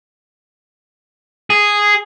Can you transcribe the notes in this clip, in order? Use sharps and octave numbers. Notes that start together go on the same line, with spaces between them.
G#4